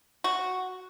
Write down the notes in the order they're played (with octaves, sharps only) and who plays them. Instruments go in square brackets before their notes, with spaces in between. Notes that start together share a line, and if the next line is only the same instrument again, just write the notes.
[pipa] F#4